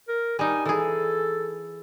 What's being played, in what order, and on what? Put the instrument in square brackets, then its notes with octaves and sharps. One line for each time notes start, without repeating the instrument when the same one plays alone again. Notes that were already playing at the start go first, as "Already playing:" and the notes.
[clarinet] A#4
[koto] G3 D#4 [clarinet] G#5
[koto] E3 G#4 [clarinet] A4